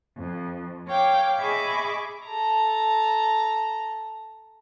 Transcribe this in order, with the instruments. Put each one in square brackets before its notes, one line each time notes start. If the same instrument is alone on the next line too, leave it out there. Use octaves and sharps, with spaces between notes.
[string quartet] F2
C#5 F5 G5 D6
G#4 D#5 E5 B5 C#6 D6
[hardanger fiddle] A4 A#5